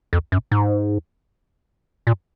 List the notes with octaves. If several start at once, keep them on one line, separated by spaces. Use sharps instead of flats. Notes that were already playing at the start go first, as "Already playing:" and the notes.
F2
F#2
G#2
A#2